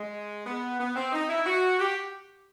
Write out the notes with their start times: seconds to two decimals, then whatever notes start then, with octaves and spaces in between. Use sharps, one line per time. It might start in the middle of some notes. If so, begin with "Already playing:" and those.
Already playing: G#3
0.46 B3
0.79 B3
0.96 C4
1.13 D#4
1.29 E4
1.46 F#4
1.79 G4